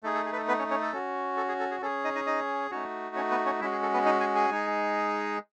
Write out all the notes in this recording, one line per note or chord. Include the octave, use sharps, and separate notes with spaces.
A3 D#4 G#4 A4
A4
G#4
B4
A4
B3 B4
C#4 C#5
C#4 C#5
A4
C#4 F#4
A4
G#4
A4
G#4
C#4 G#4 A4
D#4 D#5
D#4 D#5
D#4 D#5
A3 C#4 D#4 F#4 C#5
C#4 C#5
B3 B4
C#4 C#5
G#3 C#4 E4 F#4 E5
G#4
A4
B3 B4
D#4 D#5
G#4 G#5
G#4 G#5
G#3 D#4 G#4